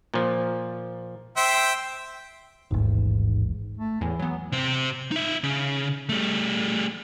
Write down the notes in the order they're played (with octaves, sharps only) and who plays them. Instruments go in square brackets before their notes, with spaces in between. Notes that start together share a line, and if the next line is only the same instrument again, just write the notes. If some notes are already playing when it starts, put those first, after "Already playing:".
[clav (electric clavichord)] A#2 F3
[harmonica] C5 E5 G5
[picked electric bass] D#1 A1 [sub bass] G#2
[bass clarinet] A3
[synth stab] E2 A2 [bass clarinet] E3
[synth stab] F#3 B3
[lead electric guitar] C3 C5
D#4 E5
C#3
G3 A3